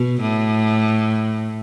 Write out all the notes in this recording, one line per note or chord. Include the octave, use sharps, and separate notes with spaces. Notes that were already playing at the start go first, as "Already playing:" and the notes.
Already playing: B2
A2